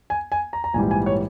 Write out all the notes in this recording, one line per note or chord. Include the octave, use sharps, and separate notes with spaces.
G#5
G#5
A#5
A#5
A#1 G#2 E3 G3 G#5
G#5
C#5